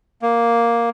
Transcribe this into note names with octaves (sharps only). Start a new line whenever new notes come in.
A#3